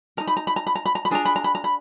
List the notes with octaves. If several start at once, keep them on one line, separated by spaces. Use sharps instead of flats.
D#4 A#4 A#5
B5
A#5
B5
A#5
B5
A#5
B5
A#5
B5
D4 F4 G#4 B4 A#5
B5
A#5
B5
A#5
B5